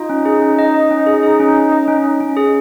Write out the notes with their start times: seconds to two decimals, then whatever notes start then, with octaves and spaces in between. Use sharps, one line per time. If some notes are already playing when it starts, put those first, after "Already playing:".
Already playing: D#4 F4
0.10 C#4
0.25 G#4
0.42 C#4
0.59 D#5
0.74 D#5
0.91 C#4
1.07 G#4
1.23 G#4
1.40 C#4
1.56 C#4
1.72 D#5
1.88 C#4
2.04 C#4
2.20 C#4
2.37 G#4